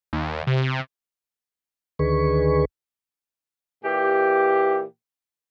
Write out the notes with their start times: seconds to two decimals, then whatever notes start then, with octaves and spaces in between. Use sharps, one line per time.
0.13 D#2
0.47 C3
1.99 D2 D3 D#3 G#4 B4 C#6
3.84 A#2 E3 G4